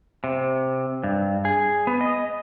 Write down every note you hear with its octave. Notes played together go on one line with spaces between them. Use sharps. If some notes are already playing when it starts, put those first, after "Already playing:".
C3
G2
G#4
B3
D#5